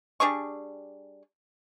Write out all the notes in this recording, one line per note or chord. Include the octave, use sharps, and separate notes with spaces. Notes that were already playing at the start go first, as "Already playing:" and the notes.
G3 D4 G#4 C#6